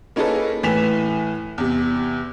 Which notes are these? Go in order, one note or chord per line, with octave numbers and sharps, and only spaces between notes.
A#3 C#4 D#4 G#4 A4 B4
A2 E3 G#5 B6 E7 F7
E2 C3